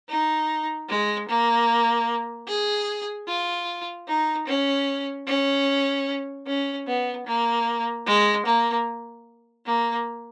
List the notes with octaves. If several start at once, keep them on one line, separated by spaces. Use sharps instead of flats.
D#4
G#3
A#3
G#4
F4
D#4
C#4
C#4
C#4
B3
A#3
G#3
A#3
A#3